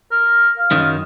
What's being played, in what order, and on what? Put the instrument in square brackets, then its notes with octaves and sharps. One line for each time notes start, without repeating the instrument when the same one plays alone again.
[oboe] A#4
F5
[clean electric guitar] F#2 D#3